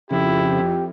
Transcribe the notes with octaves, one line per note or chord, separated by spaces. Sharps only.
F2 C#3 E4 G4